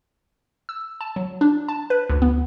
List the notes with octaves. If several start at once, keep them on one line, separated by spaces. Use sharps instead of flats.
E6
A5
F#3
D4
A5
B4
D2
B3